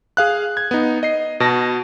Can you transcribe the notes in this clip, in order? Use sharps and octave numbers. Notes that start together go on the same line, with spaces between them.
G#4 F5 F#6
G#6
B3 D#4
D#5 C7
B2 A5 A#6